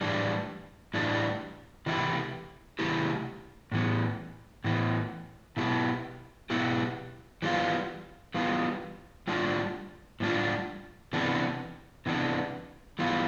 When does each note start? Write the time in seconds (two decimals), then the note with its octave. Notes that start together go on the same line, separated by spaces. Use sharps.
0.01 A2 E3 G3 D4
0.94 A2 E3 G3 D4
1.86 C3 E3 A3 E4 G4
2.79 C3 E3 A3 E4 G4
3.72 A2 E3 B3
4.64 A2 E3 B3
5.57 B2 B3 E4 G4
6.50 B2 B3 E4 G4
7.42 E3 G3 B3 F4
8.34 E3 G3 B3 F4
9.27 A2 G3 D4 F4
10.20 A2 G3 D4 F4
11.13 C3 E3 B3 D4
12.06 C3 E3 B3 D4
12.99 E3 G3 B3 F4